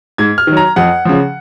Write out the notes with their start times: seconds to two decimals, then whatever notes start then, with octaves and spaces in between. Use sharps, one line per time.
0.18 G#2 G#6
0.38 F6
0.47 D#3 F#3
0.57 A#5
0.76 F2 F#5
1.05 C#3 F3